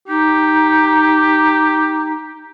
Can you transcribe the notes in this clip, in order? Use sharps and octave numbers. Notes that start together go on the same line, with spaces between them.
D#4 G4